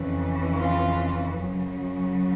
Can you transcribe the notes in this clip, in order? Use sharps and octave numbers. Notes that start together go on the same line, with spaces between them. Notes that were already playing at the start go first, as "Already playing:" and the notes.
Already playing: F2 C#3 E3
F4
F#2 C#3 F#3